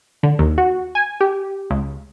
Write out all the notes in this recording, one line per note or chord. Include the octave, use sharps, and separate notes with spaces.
D3
D#2
F#4
G#5
G4
C#2